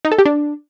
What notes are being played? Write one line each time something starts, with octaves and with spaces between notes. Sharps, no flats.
D#4
A4
G4
D4